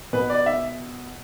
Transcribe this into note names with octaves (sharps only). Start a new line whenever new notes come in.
B2 B4
D5
E5